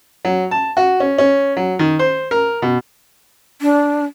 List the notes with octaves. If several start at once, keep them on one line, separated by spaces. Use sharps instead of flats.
F#3
A5
F#4
C#4
C#4
F#3
D#3
C5
A#4
B2
D4